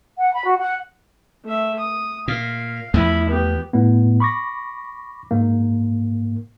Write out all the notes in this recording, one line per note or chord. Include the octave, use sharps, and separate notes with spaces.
F#5
B5
F#4
F#5
A3 E5
D#6
A#2 F5
E2 F3 A3 E4 B5
B3 G4
A2 A3 B3
B5 C#6 D6 A#6
G#2 A#3